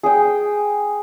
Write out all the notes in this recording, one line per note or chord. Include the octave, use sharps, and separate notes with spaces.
G#4 G5